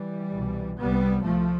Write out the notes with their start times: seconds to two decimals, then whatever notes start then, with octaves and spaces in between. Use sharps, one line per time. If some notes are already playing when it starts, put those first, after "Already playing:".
Already playing: E3 G3
0.32 C2 B2
0.79 C2 C3 G3 B3
1.25 C2 C3 F3 A3